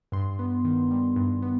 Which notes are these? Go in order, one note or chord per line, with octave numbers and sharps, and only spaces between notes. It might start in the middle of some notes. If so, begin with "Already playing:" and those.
G2 C6
B3
D#3
G3
G2
B3